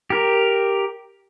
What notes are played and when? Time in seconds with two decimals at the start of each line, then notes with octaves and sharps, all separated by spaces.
0.10 G4 A#4